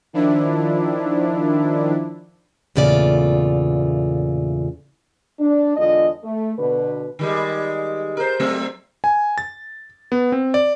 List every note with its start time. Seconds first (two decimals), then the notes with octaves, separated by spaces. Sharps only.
0.13 D#3 F3 D4 E4
2.76 E2 A#2 C#3 A3 F4 D5
5.40 D4
5.77 E2 D3 G#3 F4 D#5
6.23 A3
6.58 B2 D3 B4
7.19 D#3 G3 G#3
8.17 A#4 C5
8.40 F#3 A3 C4
9.04 G#5
9.38 A6
10.12 B3
10.32 C4
10.54 D5